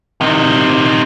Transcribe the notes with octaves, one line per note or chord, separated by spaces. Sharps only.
C3 D#3